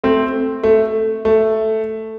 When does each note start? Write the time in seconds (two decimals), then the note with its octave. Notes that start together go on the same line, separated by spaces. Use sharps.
0.04 A3 C4
0.63 A3
1.25 A3